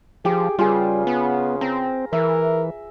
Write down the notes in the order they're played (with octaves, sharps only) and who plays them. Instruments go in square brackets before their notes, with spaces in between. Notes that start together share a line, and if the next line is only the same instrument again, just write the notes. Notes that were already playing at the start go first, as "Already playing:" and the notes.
[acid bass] F3 [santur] G4 D6 [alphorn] G#4
[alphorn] C#3 [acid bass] G3 [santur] F4 G#4 B4
[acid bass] B3
[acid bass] C4 [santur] A#5
[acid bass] E3 [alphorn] A#4 [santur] E5